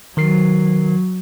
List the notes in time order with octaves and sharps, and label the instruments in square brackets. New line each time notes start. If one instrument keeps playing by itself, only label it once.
[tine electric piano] D#3 A#4 C7 [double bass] F#3